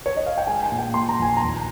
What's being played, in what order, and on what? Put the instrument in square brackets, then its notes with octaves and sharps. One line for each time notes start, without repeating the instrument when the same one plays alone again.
[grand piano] C#5
D#5
F5
G5
G#3 G#5
G#5
A#2
G5
A#2 C6
A#5
A#1 G#5
A#5
D#2